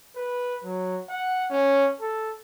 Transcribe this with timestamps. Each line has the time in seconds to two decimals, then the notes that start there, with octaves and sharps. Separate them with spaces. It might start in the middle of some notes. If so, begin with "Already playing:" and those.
0.15 B4
0.64 F#3
1.09 F#5
1.50 C#4
2.01 A4